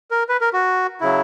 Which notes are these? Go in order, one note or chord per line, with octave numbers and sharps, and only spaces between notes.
A#4
B4
A#4
F#4
C#3 F#3 E4